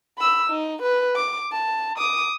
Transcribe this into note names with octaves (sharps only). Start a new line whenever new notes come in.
B5 E6
D#4
B4
D6
A5
D6 D#6